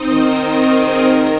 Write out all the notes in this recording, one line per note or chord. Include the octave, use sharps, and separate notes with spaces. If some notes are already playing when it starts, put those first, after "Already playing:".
Already playing: C4 D#4 C5 D#5
D#3 A#4
A#4
G#4
A#4